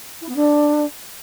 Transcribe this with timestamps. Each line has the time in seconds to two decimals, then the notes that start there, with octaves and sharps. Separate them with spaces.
0.21 E4
0.28 B3
0.35 D4